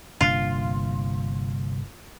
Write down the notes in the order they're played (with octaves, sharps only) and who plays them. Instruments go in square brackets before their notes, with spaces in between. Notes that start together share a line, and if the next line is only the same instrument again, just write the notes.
[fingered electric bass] G1 A#2 D4 [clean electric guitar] C2 [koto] F4